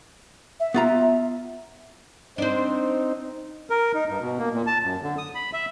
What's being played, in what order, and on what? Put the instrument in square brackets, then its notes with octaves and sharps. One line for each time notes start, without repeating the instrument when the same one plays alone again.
[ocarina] E5
[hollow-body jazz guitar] B3 F4 A#5
[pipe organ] C4 D#4 [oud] D4 C5
[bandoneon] A#4
D#4
G2
B2
A#3
A#2
A5
F#2
D3
D#6
B5
E5